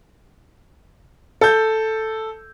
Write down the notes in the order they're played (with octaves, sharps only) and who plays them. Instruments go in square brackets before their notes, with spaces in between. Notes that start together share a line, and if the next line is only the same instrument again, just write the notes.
[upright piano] A4 G6